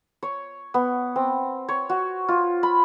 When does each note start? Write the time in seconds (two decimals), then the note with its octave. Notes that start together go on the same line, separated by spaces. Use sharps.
0.23 C#5
0.74 B3
1.16 C4
1.69 C#5
1.90 F#4
2.28 F4
2.63 B5